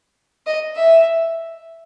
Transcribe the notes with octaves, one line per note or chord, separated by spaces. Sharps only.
D#5
E5